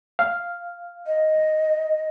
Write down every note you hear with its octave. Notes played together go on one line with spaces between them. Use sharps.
F5
D#5